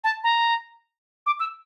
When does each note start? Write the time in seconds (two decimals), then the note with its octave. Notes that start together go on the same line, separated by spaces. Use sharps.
0.04 A5
0.24 A#5
1.26 D6
1.40 E6